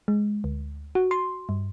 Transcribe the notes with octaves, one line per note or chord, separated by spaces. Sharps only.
G#3
D2
F#4
C6
G2